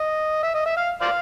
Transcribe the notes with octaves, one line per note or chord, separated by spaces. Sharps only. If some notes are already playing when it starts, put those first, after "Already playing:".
Already playing: D#5
E5
D#5
E5
F5
C5 D5 F5